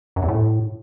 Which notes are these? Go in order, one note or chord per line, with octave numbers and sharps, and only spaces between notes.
F#2
E2
A2